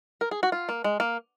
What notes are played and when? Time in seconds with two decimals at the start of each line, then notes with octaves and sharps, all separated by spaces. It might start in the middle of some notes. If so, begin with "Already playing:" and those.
0.21 A#4
0.31 G#4
0.43 F#4
0.52 F4
0.69 A#3
0.84 G#3
1.00 A#3